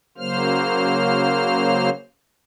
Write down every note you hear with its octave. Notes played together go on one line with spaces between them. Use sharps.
C#3 F#3 A#3 C5 F6